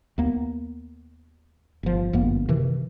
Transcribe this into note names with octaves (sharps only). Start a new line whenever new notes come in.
D#2 A#3 B3
G1 F3
G1 F#2 A#3 B3
C3 D#3 E3